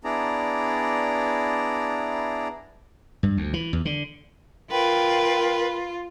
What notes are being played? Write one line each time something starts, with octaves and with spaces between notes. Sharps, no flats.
B3 D4 E4 G#4 D5 A#5
G2
D2
E3
E2
D3
F4 A#4 B4 G5